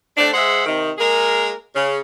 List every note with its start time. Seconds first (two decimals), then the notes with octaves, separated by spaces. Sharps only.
0.17 A3 C4 D4
0.33 G#3 G#4 C5 E5 F#5
0.66 C3 D#3
0.97 G#3 A#3 G#4 A#4
1.75 C#3